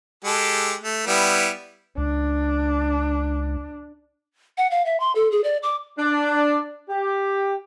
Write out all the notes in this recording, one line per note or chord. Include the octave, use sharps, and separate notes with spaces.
G#3 G4 A4
A3
G3 B3 E4
C#2 D4
F#5
F5
E5
C6
A4
G#4
D5
D6
D4
G4